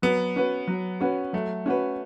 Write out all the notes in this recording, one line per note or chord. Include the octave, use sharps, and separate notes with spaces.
F#3 B3
C#4 F#4 B4
F#3
C#4 F#4 B4
F#3 A3
C#4 F#4 B4